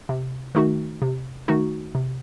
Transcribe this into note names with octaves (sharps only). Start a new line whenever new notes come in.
C3
D#3 A3 D#4 F#4
C3
D#3 A3 D#4 F#4
C3